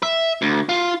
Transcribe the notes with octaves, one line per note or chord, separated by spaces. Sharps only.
E5
D2
F4